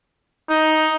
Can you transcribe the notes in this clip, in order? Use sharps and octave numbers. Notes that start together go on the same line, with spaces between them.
D#4